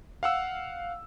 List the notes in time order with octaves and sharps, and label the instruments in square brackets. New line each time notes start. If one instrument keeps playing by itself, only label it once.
[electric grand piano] F5 F#5 E6